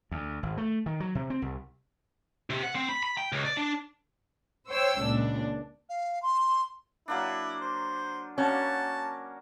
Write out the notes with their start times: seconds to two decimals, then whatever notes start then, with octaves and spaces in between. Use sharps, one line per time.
0.11 D2
0.43 G#1
0.57 A3
0.86 D#3
1.00 F#3
1.15 C3
1.30 C4
1.42 C2
2.50 C3
2.63 F#5
2.75 C4
2.89 B5
3.03 B5
3.17 G5
3.32 C#2
3.45 D5
3.57 D4
4.70 C5 C#5 G5 E6
5.03 C#2 A#2 D4
5.89 F5
6.23 C6
7.08 F#3 A#3 D4 E4
7.61 C5
8.38 A#3 C#4 F#4 A5